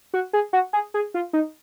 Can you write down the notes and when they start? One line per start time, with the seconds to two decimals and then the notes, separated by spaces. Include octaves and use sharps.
0.14 F#4
0.33 G#4
0.53 F#4
0.73 G#4
0.94 G#4
1.14 F4
1.33 D#4